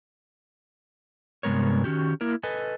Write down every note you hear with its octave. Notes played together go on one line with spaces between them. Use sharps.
G2 C3 G#3 B3 A#4 C#5
D#3 C#4 F#4 G4
A#3 E4 A#4
A4 B4 D#5 G#5